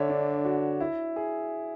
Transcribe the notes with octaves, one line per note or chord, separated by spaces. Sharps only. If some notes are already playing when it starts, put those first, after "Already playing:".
Already playing: D3 C#5 D5 E5
D4
F#4
E4
G#4